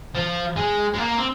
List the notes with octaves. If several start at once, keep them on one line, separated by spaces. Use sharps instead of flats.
F3
G#3
G#3
A#3
C4